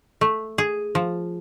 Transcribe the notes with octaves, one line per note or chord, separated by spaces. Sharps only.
A3
G#4
F3